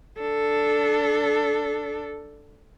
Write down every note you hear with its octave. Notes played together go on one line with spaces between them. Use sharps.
D4 A4